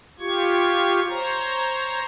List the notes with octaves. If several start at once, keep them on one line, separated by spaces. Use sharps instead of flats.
F4 G4 C#6 G#6
C5 C#5 A#5